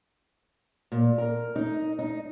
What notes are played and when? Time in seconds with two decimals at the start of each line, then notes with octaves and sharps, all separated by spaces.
0.92 A#2
1.18 A#4
1.56 D#4
1.99 D#4